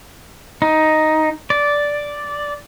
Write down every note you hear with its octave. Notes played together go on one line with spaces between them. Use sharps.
D#4
D5